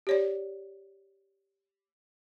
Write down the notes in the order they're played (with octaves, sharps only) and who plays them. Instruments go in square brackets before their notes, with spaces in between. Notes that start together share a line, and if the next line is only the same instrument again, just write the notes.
[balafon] G4 C#5 D5